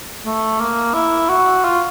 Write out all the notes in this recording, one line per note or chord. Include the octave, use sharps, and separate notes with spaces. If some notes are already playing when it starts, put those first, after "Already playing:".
A3
A#3
E4
F#4
F4